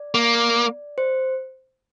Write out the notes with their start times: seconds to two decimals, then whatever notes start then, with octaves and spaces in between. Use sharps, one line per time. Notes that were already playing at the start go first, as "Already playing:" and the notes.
Already playing: D5
0.15 A#3
0.98 C5